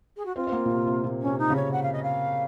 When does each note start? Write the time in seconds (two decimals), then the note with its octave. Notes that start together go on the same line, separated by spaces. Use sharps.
0.16 G#4
0.25 F#4
0.36 C4 F4
0.47 C4
0.52 A#3
0.65 A#2
0.70 C3
0.87 C3
1.04 A#2
1.21 C#4
1.27 C3
1.38 D#4
1.50 C#3
1.56 C#5
1.72 F#5
1.83 F5
1.92 D#5
2.03 F5